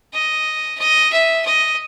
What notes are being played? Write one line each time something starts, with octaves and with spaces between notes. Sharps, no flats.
D#5
D#5
E5
D#5